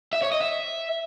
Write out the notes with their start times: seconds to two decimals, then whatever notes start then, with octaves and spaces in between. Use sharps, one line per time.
0.13 E5
0.22 C#5
0.32 D#5
0.41 E5